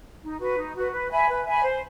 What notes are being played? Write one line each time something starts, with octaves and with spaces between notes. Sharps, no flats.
D#4
F#4 B4
D#4
F#4 B4
B4
E5 G#5 B5
B4
E5 G#5 B5
C5